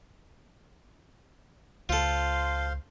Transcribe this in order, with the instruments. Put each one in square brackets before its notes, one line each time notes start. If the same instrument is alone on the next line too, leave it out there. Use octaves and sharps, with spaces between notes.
[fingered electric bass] C#2 [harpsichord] F4 A4 [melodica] C5 F5 C6